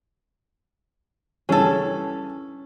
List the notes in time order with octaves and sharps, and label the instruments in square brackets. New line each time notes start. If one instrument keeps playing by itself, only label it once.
[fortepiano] G2 C#3 E3 [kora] C#4 [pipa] G#4 A4